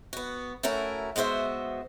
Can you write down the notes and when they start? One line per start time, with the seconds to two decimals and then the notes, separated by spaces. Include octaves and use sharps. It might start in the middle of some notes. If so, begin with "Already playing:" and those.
0.13 B3 F#4
0.63 A3 C#4 E4 F#4 A#4
1.16 G#3 B3 F#4 C5 E5